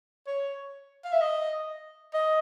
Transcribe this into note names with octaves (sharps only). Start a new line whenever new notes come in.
C#5
F5
E5
D#5
D#5